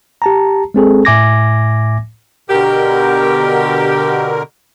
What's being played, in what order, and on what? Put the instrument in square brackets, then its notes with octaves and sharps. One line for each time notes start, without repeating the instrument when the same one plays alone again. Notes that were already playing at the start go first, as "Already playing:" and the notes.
[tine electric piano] G4 A5 A#5
G#3 C4 G#4 A4
A2 E5 G#5 D6 G#6 A#6
[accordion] B2 D3 A#4 [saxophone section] G4